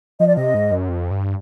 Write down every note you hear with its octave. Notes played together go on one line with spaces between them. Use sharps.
F3 D#5
D5
C3 D#5
G#2
F#2
F2
G2